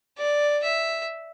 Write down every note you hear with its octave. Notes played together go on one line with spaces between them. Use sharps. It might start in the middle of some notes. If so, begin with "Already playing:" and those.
D5
E5